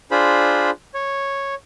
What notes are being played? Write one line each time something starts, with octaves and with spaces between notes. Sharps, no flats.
D4 F4 G#4 C5 B5
C#5